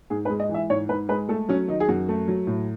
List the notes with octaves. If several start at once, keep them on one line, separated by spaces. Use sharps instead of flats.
G#2 G#4
B4
G#3
D#5
E3
E5
G#2 C#5
G#2 B4
G#3 B4
A3 A4
F#3 C#4
D#3 D#4
G#4
F#2 F#4
A3
F#3
A2